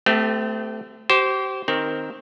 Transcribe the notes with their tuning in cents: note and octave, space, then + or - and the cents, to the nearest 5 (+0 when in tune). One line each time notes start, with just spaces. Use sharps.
A3 +0 C4 -40 G4 +0
G4 -35 C5 +0
D#3 +0 C4 +5 A#4 +0